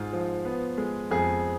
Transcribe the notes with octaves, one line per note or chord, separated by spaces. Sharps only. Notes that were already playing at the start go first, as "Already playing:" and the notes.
Already playing: G#2 G#3 F4
F3
B3
G#3
F2 G#4